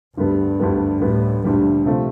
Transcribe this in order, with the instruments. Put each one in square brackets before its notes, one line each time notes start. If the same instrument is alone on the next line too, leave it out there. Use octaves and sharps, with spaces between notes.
[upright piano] D2 D3 G3 B3 [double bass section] G2
[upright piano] D2 D3 G3 B3
[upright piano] D2 D3 G3 B3 [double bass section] A2
[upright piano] D2 D3 G3 B3 [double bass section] A#2
[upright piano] C3 F3 A3 C4 F4